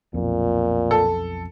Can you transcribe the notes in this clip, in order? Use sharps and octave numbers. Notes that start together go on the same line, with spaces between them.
B1 F2 A#2
A4